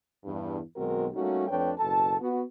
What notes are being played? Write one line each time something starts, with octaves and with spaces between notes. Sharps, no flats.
E2 G2
B1 D#3 G#3 C4 F#4 A#4
G3 A3 A#3 C#4 D#4 F#4
F2 A3 D4 B4 C#5 G5
F#1 B2 A4 A5
B3 F#4